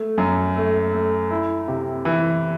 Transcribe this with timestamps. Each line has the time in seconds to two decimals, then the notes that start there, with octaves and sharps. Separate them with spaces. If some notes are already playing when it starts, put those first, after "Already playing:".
Already playing: A3
0.18 F#2
0.56 A3
0.93 A3
1.31 E4
1.68 C3
2.05 E3